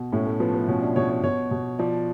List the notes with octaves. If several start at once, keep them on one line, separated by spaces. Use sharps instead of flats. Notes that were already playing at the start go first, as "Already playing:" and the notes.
Already playing: B2
A2 C#4
A3
F3 B3
B3
B2 C#4
D4
B2 C#5
C#5
B2 C#5
B2
F3 D5